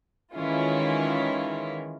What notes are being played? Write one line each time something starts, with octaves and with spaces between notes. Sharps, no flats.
D#3 E3 G#3 C#4 E4 F4